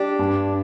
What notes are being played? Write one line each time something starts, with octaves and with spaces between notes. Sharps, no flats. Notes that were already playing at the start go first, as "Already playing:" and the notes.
Already playing: D4 G4
G2